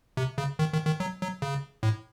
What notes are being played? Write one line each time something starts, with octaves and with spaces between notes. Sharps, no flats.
C3
C#3
D#3
D#3
D#3
F#3
F#3
C#3
A2